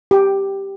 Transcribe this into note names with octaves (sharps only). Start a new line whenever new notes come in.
G4